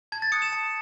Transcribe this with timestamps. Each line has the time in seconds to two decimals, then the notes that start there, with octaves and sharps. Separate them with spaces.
0.12 A5 G#6
0.22 A6
0.32 D#6 F#6 C#7
0.42 E7
0.52 A5